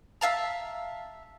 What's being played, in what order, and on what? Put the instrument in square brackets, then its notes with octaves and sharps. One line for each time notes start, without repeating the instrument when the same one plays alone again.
[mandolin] E5 F5 A5 A#5